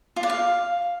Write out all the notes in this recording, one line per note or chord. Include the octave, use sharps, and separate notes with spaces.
F4
D5
F5